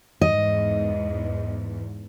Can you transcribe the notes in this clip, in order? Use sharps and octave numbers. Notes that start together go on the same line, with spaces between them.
E2 G#2 D#5